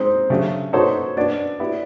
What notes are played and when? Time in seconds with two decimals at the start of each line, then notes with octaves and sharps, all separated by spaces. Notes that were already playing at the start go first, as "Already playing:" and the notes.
Already playing: G#3 C4 D#4 C5
0.30 C#3 F#3 A3 D4 G4
0.73 B3 D#4 F#4 A4 C5 C#5
1.17 B3 D4 F#4 D5
1.59 B3 E4 G4 B4